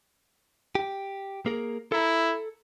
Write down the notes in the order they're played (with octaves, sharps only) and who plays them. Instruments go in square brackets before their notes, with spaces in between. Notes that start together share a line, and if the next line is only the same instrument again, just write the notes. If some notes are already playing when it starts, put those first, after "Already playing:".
[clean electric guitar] G4
A#3 G#4 A#4
[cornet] E4 [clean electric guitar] A4 A#5